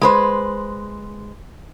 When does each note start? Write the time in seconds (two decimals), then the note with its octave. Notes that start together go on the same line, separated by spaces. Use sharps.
0.01 G#3 B4 C5